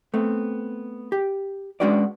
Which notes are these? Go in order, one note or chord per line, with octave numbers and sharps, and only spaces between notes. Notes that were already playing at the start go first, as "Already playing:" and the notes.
A3 B3 C4
G4
G#3 C#4 D4 F#4 B4 D5